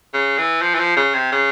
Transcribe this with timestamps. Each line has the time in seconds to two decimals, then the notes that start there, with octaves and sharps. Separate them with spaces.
0.14 C#3
0.38 E3
0.62 F3
0.75 E3
0.79 F3
0.97 C#3
1.14 C3
1.32 C#3